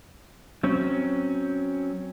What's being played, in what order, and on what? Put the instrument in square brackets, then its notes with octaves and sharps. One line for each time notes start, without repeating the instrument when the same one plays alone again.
[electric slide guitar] F#3 C4 C#4